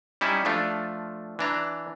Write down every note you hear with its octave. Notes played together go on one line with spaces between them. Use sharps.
G3 C#4 D#4 E4 E5
F3 A3 D4 F4
E3 D4 A#5